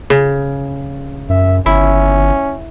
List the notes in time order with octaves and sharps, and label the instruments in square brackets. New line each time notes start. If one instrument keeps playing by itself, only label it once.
[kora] C#3
[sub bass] F#2 [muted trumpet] E5
[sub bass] G1 [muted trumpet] C#4 [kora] E4